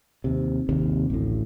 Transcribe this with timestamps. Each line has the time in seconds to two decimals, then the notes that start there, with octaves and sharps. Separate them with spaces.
0.24 D#2 C3
0.69 G#1 D#2 C3
1.10 A1 D2 A2